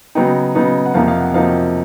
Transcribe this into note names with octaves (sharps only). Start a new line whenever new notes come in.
C#3 F#3 B3 D#4 G5
C#3 F#3 B3 D#4
F#5
F2 C3 F3 A#3 D#4 F5
F5
F#5
F2 C3 F3 A#3 D#4 F5